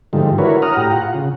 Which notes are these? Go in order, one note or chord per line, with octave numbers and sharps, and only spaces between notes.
G#2 D3 D#3 F3 G3 A3
D4 E4 F#4 A#4 B4 C#5
F#5 A#5 D#6 F6
A2 G4 A#5
F4 F#5
C#3